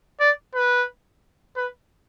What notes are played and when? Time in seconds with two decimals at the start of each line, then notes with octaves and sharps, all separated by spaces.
0.20 D5
0.55 B4
1.56 B4